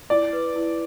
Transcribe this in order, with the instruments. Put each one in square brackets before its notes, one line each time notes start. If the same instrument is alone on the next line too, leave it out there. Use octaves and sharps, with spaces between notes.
[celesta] E4 [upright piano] D5
[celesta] B4
E4